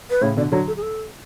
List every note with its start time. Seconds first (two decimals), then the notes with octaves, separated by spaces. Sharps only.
0.10 B4
0.21 A2 C#3 C#5
0.37 B2 D3 D5
0.51 D3 F#3 C#5
0.67 A4
0.77 G#4
0.82 A4